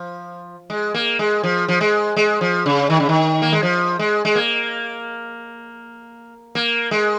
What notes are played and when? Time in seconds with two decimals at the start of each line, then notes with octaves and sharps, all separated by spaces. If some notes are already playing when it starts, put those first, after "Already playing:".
Already playing: F3
0.70 G#3
0.94 A#3
1.19 G#3
1.43 F3
1.68 F3
1.81 G#3
2.16 G#3
2.41 F3
2.66 C#3
2.90 D#3
3.00 C#3
3.09 D#3
3.42 A#3
3.52 G#3
3.63 F3
3.99 G#3
4.25 G#3
4.35 A#3
6.55 A#3
6.91 G#3